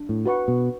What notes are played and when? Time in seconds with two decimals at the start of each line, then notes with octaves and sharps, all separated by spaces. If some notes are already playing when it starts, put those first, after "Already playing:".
Already playing: D4
0.09 A2
0.25 F#4 B4 F#5 C#6
0.48 B2